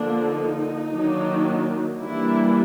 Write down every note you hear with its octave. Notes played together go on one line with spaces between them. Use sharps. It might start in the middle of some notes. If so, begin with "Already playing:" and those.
Already playing: D3 F3 A#3 D4
D#4
D#3 F#3 A#3 D4
E3 G3 A#3 D4 E4